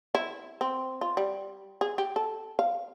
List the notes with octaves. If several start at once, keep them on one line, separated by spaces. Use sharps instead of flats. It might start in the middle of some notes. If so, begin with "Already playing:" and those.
E4
C4
F4
G3
G#4
G4
A4
F5